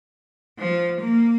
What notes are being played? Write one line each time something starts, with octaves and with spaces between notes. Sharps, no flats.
F3
A#3